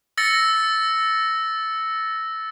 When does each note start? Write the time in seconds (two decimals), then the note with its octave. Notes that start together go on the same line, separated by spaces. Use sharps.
0.18 E6 A6 A#6 C#7